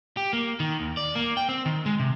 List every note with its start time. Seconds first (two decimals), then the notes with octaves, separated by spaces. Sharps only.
0.17 G4
0.33 A#3
0.60 D#3
0.80 D#2
0.97 D5
1.15 A#3
1.37 G5
1.49 C4
1.66 D#3
1.86 G#3
2.00 C3